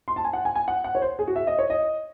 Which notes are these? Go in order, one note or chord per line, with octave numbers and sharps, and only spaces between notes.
C6
A5
G#5
F#5
G#5
G#5
F#5
F#5
C#5
C5
G#4
F#4
E5
D#5
C#5
D#5